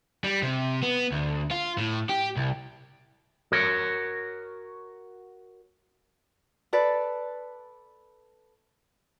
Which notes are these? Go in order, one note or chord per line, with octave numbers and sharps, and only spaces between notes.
G3
C3
B3
D2
F4
A2
G4
C2
F#4 A#4 C#5
A4 B4 D5